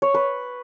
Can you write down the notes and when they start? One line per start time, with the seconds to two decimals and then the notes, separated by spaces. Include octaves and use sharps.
0.02 C#5
0.14 B4